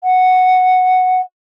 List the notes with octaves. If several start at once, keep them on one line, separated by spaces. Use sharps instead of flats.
F#5